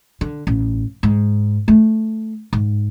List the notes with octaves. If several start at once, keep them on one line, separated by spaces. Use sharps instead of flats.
D3
A1
G#2
A3
G#2